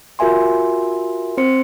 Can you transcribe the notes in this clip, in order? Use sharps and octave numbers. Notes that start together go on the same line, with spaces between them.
F4 F#4 A#4 E5 G#5 C6
C4 C5 C6 C#7